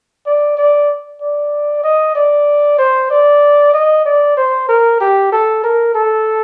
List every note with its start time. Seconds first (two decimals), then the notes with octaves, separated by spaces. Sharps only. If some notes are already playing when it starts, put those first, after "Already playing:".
0.26 D5
0.57 D5
1.21 D5
1.83 D#5
2.15 D5
2.78 C5
3.10 D5
3.74 D#5
4.05 D5
4.37 C5
4.69 A#4
5.00 G4
5.32 A4
5.64 A#4
5.95 A4